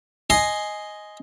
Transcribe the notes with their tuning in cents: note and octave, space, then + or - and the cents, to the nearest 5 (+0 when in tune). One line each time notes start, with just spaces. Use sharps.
D#5 +0 G#5 +5 C6 +0